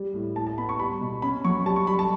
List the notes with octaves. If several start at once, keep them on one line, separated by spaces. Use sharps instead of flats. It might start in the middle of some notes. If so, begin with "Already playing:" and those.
Already playing: G3
A2
A2 A5
A5
B3 B5
C#6
G3 B5
B2
C#4 B5
F#3 C#6
G3 A5
C#6
G3 B5
A5